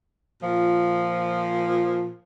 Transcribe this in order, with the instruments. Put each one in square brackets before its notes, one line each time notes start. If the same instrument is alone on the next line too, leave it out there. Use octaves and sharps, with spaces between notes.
[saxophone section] A#2 F3